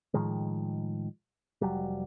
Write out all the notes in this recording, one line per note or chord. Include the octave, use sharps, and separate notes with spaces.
A2 D#3 F3 G#3
F1 F#3 G3